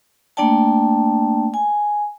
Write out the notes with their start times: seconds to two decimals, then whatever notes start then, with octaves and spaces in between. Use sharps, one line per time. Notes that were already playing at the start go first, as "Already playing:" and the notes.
0.37 A3 A#3 D4 D5 G5 A5
1.54 G#5